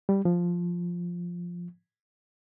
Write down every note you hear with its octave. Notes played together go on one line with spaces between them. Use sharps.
G3
F3